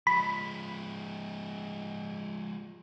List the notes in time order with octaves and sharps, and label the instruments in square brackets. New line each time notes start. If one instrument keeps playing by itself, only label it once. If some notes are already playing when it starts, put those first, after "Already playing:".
[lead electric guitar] F3 G#3 [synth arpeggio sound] B5